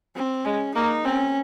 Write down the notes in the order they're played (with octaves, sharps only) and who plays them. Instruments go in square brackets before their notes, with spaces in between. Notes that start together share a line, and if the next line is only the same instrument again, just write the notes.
[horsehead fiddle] C4
[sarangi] G#3 [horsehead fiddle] C#4
[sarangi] A#3 [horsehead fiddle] D#4
[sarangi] C4 [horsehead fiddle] C#4